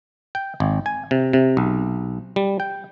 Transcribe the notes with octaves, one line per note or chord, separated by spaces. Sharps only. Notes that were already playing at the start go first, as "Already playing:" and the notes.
G5
G#1
G#5
C3
C3
B1
G3
G5